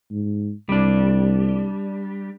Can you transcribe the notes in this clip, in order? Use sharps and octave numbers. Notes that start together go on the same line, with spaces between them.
G#2
C2 G3 D4